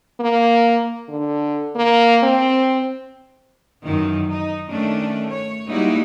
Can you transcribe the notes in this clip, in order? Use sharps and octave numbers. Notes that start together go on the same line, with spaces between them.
A#3
D3
A#3
C4
F#2 D#3 E3
D#4
D#3 A3 C#4 D4
C#5
G3 G#3 A#3 D#4 E4 F#4